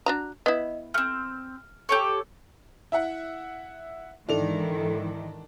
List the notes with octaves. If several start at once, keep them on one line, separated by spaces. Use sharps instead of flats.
D4 F#4 A#5
B3 E4 D#5
A3 C4 F6
G4 A4 C#5
E4 E5 F#5
G#2 D#3 E3 D4 E4 A4 F7